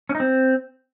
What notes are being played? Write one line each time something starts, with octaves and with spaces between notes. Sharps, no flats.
C#4
D#4
C4